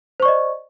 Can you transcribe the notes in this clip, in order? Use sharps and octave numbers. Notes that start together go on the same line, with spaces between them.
C5 D5 D#5 C#6